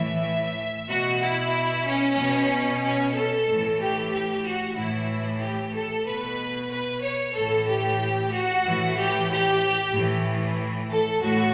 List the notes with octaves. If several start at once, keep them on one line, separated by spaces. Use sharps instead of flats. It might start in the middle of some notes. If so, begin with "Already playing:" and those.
Already playing: A2 E3 E5
B2 F#4
E4
C#4
B2
C#4
A4
A2 E3
G4
F#4
A2 E3 E4
G4
A4
B2 B4
B4
C#5
A2 E3 A4
G4
F#4
A2 E3
G4
G4
A2 E3
A4
A2 F#4